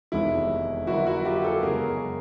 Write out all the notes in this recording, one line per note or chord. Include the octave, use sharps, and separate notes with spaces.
F1 E2 C3 D#3 G#3 E4
F2 D3 F#3 A#3 E4 F#4
E4 F#4
F4 G4
G4 A4
F#2 C#3 E3 G#3 B3 G#4 A#4